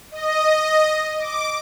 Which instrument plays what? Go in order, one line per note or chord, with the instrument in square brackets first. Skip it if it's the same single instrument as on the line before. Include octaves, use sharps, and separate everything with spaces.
[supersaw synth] D#5
D6